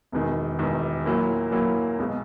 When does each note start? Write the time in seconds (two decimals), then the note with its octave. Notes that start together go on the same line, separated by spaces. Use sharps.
0.12 E1 E2 D#3
0.59 E1 E2 D#3
1.06 A#2 F#3 A#3 E4
1.52 A#2 F#3 A#3 E4
1.99 B1 B2 G#3